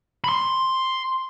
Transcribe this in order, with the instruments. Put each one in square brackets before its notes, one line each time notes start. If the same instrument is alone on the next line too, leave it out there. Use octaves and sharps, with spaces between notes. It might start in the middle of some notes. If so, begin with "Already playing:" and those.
[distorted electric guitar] B5 C6